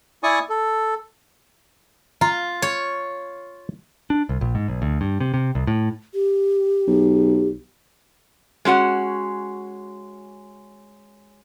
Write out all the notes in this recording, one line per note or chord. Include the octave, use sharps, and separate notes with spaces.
E4 D5 G#5 C#6 D#6
A4
F4 A#5
C#5
D4
C2
A#1
G#2
B1
D2
G2
C3
C3
C2
A2
G4
B1
G#3 C#4 F#4 F#5